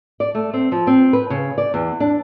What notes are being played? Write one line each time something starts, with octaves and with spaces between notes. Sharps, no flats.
D5
A3
C4
F3
C4
B4
C#3
D5
E2
D4